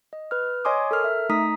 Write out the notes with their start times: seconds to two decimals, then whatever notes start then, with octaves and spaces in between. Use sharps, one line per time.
0.13 D#5
0.31 B4 F6
0.65 C#5 D#5 G#5 C6 D6 D#6
0.91 A4 A#4 F6
1.04 E5
1.29 A3 D#4 A#5 D#6 B6